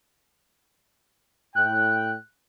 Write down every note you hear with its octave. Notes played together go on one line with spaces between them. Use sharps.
A2 G5 F#6